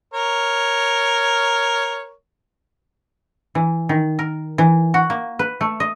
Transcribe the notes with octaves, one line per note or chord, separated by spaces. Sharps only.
A#4 C#5
E3
D#3
A#4
E3
F#4
A#3
B4
A3
D#5